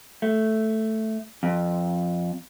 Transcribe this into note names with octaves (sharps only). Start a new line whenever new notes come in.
A3
F2